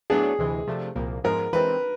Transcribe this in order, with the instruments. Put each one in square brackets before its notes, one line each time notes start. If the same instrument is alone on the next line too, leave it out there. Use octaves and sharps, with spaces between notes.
[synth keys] A2 F#3 B3 D4 [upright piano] G#4
[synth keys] D2 C3 E3 G#3
C3 F3 A3 D4
C2 A#2 F3 A#3
[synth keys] G#2 F3 G#3 B3 [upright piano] A#4
[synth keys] E3 G#3 C4 [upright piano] B4